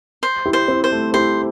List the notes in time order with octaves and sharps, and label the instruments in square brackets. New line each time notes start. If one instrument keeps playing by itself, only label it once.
[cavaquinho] C5
[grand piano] E4 G4
[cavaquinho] C5
[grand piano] C4 E4
[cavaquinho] C5
[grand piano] A3
[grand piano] E4 G4 [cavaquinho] C5